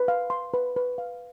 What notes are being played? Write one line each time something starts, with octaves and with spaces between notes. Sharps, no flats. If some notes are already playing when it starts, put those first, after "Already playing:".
Already playing: B4
F5
C6
B4
B4
F5